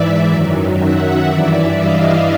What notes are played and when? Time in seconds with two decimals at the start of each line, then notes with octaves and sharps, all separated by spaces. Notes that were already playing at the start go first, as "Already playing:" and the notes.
Already playing: G#2 E3 D5 E5
0.26 F#2 D#3 F#3
0.75 E5 F#5
1.25 G2 E3 D5 E5
1.76 D#5 F5